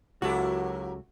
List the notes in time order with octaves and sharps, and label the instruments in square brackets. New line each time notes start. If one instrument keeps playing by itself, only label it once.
[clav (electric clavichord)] C#2 A4 [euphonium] F#3 [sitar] A#3 E4 G4 [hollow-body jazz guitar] F#4